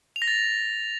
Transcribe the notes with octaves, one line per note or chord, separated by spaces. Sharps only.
F7
A#6
A6